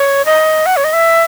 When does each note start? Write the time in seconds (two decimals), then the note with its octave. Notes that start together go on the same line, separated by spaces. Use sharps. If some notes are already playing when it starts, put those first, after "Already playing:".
Already playing: C#5
0.25 D#5
0.66 F#5
0.76 C#5
0.84 D#5
0.93 E5